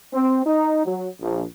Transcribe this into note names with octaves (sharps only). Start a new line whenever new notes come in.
C4
D#4
F#3
A#1